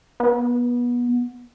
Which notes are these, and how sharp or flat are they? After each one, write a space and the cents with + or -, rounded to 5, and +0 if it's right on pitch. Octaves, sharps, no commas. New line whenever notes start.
B3 -25